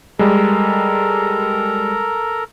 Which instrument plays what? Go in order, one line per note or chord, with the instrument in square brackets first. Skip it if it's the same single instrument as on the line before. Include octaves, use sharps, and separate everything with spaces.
[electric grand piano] G3 G#3 [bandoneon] A4 A#4 A#5